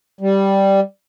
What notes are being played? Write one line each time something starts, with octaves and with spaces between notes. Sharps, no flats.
G3